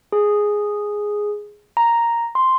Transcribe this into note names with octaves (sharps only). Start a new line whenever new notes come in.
G#4
A#5
C6